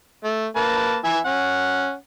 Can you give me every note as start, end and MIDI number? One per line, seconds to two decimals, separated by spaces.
0.24 0.46 57
0.56 0.97 58
0.56 0.97 71
0.56 0.97 81
1.04 1.18 52
1.04 1.18 76
1.04 1.18 80
1.25 1.93 61
1.25 1.93 78